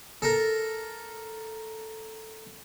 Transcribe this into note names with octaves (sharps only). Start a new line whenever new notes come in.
A4 A#4